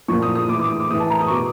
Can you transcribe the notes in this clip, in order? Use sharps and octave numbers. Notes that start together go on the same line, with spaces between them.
A#2 F3 C#6
D#6
D#6
A2 E3 D6
D6
D#6
D6
A2 E3 D#6
A5
A#5
D#6
C#6
B2 D6